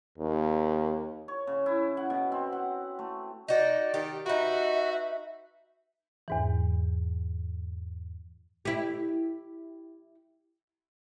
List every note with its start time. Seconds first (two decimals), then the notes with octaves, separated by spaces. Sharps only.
0.18 D#2
1.28 C#5
1.47 C#3
1.66 E4
1.97 F#5
2.10 B2
2.32 C4
2.52 F#5
2.99 A3
3.48 D#4 F#4 D5
3.94 D#3 G4
4.26 D#4 F#4 B4 E5
6.28 E2 G#2 E3
8.65 E4 G4